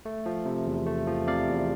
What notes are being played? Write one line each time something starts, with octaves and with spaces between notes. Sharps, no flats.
A3
F3
C3
E2
A3
F3
C3 D5 F5
E2